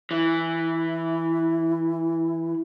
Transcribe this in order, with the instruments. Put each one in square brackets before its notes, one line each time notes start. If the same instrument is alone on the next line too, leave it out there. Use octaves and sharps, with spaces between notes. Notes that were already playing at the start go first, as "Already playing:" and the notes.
[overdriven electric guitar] E3 [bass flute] E4